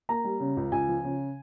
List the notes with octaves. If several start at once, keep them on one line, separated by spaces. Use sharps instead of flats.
A#3 A#5
G3
C#3
C#2
C#2 G#5
F3
C#3